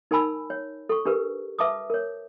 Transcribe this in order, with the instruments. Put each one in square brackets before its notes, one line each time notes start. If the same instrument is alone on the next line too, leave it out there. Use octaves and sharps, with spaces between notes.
[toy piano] D#4 A#4 G#5 A5 B5 E6
C#5
A4 C#6
D4 G4 A#4 B4
B4 E5 A5 D6 D#6
A#4 C#5